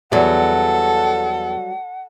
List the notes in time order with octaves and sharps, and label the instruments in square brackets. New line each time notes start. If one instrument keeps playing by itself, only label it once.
[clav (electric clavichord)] E2 [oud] F#3 G3 [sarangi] A4 [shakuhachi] F#5